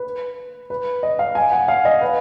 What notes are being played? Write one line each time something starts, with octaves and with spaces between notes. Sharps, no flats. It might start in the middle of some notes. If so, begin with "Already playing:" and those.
Already playing: B4
B4
D#5
F5
G#5
F#5
F5
D#5
B4